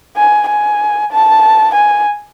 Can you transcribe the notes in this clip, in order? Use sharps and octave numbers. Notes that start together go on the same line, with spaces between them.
G#5
G#5
A5
G#5